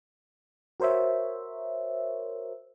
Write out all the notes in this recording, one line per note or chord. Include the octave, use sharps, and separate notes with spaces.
F#4 A#4 C5 C#5 E5